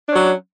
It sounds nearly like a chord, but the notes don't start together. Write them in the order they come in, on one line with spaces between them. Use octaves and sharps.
D4 C#4 F#3